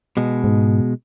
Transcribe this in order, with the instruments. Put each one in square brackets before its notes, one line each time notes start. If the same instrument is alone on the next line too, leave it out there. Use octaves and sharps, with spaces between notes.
[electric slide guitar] B2 G#3
[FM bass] G#2